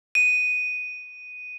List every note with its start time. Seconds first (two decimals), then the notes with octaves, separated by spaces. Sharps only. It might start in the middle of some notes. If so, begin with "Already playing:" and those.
0.15 D#7